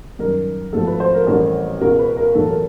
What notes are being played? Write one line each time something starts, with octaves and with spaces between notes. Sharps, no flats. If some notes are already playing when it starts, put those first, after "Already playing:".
F#2 D#3 G3 A#4
G#1 G#2 F3 A3 A4
B4
C5
A#4
A1 A2 E3 G3 A#4
C#2 B2 G#3 A#4
B4
A#4
B1 A2 E3 A4
A#4